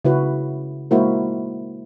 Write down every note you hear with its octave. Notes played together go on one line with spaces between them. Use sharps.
C#3 E4 F#4 B4
G#3 A#3 E4 F#4 A#4 C5